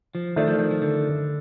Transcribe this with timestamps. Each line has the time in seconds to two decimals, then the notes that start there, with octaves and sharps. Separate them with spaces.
0.15 F3
0.36 D#3 F3 A3 D4
0.47 F3
0.59 F3
0.71 F3
0.82 D3